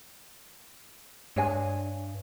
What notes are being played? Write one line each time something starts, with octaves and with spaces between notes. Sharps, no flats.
G2 D4 C#5 G#5